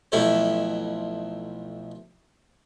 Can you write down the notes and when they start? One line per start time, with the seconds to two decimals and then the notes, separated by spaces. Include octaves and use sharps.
0.12 B1 F2 A3 E4 A4 C5